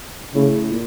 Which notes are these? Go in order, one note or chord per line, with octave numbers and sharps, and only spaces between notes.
A2 C#3
A#2